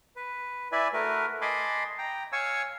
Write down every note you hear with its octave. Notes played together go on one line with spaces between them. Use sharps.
B4
E4 B4 D5 E5 G#5
A3 F#4 A#4 B4
D#5 G#5 A5 B5 C6 D6
G5 A#5
C#5 F5 G#5 C#6 E6